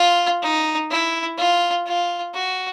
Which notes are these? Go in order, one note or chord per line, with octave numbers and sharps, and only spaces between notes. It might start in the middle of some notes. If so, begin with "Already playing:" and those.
Already playing: F4
D#4
E4
F4
F4
F#4